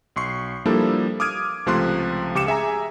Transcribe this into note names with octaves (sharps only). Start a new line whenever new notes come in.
B1 C6 C#6 C7
F3 G3 A#3 D4 E4 A4
D6 D#6 F6 G#6 D7 D#7
C#2 C3 F3 A3 C6 F#6
C#2 G4 D6 C#7 E7
G#4 E5 G#5 A#5